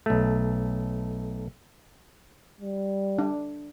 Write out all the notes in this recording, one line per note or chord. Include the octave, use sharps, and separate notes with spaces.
B1 A3
G3
D4